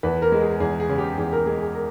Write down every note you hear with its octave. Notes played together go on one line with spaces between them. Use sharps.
E2 B4
A#4
G#3
G#4
E2 G#4
G#4
C#3
G4
E2 G#4
A#4
G#3 G#4
G#4
A#4